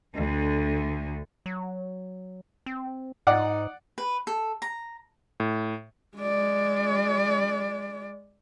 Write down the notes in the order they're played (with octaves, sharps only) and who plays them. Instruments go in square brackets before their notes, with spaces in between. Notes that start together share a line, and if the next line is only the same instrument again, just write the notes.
[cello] D2 D3
[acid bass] F#3
C4
[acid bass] G#2 [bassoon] D#4 [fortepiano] D5 F#5
[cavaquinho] B4
A4
A#5
[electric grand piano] A2
[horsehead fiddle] G#3 D5